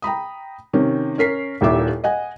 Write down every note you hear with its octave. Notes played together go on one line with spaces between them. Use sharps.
G5 A#5 B5 D#6
C3 D#3 C#4
C#4 A#4 B6 C7
D#1 D#2 A#2 E4 E5 D6
D#5 F#5 G#5